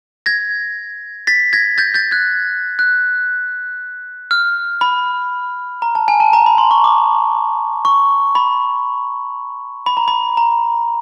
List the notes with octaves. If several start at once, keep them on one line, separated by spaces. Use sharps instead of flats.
G#6 A#6
A6 B6
G#6 A#6
G6 A6
G6 A6
F#6 G#6
F#6
F6
B5
A#5
A5
G#5
A5
A#5
B5
C6
C#6
D6
C#6
B5
B5
A#5
B5
A#5